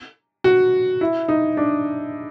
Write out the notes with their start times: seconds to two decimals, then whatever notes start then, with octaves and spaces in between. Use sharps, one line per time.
0.44 F#4
1.01 E4
1.28 D#4
1.57 D4